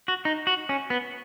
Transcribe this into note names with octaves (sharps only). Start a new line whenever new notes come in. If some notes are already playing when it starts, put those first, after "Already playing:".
F#4
D#4
F#4
C#4
B3